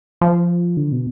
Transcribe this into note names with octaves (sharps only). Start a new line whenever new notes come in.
F3
D3
B2